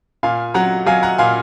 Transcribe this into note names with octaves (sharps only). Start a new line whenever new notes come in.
A#2 F5 G#5
F#3 F#5 A#5
F#3 F5 G#5
F#5 A#5
A#2 F5 G#5